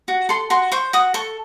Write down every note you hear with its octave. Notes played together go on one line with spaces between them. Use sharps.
F#4
A4 C6
F#4 C6
C5 C#6
F#4 D#6
A4 C#6